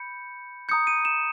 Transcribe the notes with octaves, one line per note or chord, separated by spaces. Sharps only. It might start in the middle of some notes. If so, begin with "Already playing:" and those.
Already playing: B5 G6 C#7
A#5 D#6 G6 C#7
D#7
E7